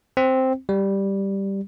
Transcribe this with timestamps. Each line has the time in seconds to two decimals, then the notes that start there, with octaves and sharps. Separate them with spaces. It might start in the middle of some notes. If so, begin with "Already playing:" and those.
0.17 C4
0.69 G3